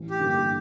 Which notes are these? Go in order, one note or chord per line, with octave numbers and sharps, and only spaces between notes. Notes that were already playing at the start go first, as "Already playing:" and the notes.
Already playing: A1
G4
G2 D3 G3 A#3
G4